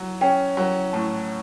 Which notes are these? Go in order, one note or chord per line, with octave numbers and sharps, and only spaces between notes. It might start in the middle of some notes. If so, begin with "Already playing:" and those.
Already playing: F#3
C#4 G5
F#3
A2 A5